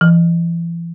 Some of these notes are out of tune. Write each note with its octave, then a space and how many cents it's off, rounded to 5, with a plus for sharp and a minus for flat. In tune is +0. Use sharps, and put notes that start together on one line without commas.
E3 +40